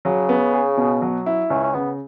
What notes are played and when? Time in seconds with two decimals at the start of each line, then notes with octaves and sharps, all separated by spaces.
0.05 C#3 F#3
0.29 B3
0.54 G#4
0.77 B2
1.02 F#3
1.26 E4
1.50 C#2 C#4
1.63 C#4
1.74 C#3 B3